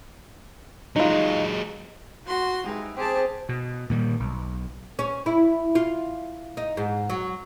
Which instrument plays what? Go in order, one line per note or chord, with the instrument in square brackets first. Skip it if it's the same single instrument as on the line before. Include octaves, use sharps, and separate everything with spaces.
[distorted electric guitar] F#3 G#3 [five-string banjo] D#4 F4
[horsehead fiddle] F#4 [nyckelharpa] C6
[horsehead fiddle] G#3 [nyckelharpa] D#4 [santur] G4 B4 E5
[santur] C4 [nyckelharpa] G4 A5 [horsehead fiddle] G#4
[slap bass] B2
A#2 D#3 G3
B1
[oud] C#4
E4
F4
D#4
G#2
F#3